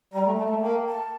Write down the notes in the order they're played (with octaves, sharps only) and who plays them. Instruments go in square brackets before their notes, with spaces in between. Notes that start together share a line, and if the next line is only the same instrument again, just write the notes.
[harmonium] G3 [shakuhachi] A#5
[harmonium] A3
[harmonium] A3 [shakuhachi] A5
[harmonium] A3
[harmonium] A#3 [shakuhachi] G5
[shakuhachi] A5